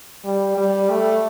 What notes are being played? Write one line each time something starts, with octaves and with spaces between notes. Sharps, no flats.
G3
G3
A3